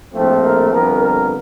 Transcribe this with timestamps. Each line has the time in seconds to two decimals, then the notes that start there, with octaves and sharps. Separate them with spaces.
0.14 A#1 A2 F3 A3 C4
0.43 A#4
0.72 F2 D3 G3 B3 A#4
1.02 A#4